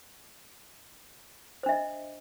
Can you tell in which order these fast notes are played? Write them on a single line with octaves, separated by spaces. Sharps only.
C5 D4 E5 D#5